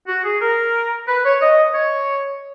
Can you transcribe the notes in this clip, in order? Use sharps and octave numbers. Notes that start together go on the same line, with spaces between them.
F#4
G#4
A#4
B4
C#5
D#5
C#5